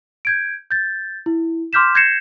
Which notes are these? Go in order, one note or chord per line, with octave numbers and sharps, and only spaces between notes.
G6 G#6 D7
G6 A6
E4
C6 D6 F6 G6 B6 E7
G6 G#6 A#6 C7 C#7 E7